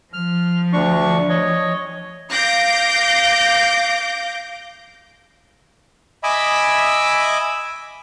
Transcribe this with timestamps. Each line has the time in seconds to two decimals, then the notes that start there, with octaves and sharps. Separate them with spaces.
0.13 F3 F6
0.73 D2 D4 C#6
1.29 C#5 D#5
2.30 F5 D6 G6 A#6 D7
6.23 D#5 E5 G#5 B5 D6 E6